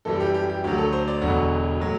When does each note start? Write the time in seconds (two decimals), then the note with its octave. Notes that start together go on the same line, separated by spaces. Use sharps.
0.05 F#2 E3 G3 A4
0.16 A4
0.20 G4
0.34 G4
0.50 G4
0.64 D2 D3 F#3 G4
0.78 A4
0.93 C5
1.08 D5
1.21 E1 E2 D3 F#3 F#4
1.80 A2 F#3